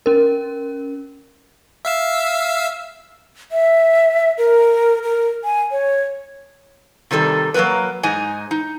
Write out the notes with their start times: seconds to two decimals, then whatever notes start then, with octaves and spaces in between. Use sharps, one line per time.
0.06 C#4 A#4
1.85 E5 F5 E6
3.52 E5
4.38 A#4
5.03 A#4
5.44 G#5
5.71 C#5
7.11 C3 D#3 G3 A4
7.54 F#3 A#3 C4 A#4 B4
8.03 G#2 D#4 D#5 G#5
8.51 D#4